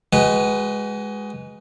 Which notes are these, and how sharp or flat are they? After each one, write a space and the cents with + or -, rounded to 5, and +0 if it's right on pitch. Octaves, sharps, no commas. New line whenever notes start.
G#3 +0 F#4 +35 B4 +0